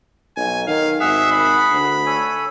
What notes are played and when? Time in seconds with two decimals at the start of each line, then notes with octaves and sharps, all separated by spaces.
0.37 B1 G#5
0.68 D#3 F5
1.00 G#1 G#4 E5 F#5
1.32 B5
1.71 D2
2.06 A4 C#5 G#5